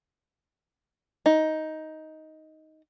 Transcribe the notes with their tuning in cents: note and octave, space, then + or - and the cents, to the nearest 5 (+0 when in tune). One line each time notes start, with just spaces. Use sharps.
D#4 +10